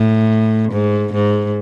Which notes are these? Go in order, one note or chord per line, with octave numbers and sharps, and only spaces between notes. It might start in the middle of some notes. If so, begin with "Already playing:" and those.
Already playing: A2
G#2
G#2